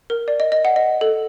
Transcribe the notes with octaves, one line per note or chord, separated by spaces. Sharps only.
A#4
D5
D#5
D#5
F#5
D#5
A4